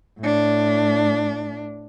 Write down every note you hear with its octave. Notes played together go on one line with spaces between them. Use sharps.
A2 D4